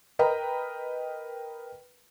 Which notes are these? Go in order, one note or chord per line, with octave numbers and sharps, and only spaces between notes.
A#4 B4 D#5 G5 A#5 B5